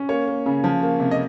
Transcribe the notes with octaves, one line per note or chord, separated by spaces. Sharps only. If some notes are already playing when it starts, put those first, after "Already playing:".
Already playing: C#4
A#3 C#5
A#3
C#3
F3
A#3
C3
D#5